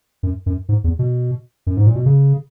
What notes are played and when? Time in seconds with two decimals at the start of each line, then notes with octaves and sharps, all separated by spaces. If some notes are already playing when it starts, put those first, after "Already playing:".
0.23 F#2
0.46 F#2
0.69 G#2
0.84 E2
0.99 B2
1.67 F#2
1.76 G#2
1.86 A#2
1.95 B2
2.06 C#3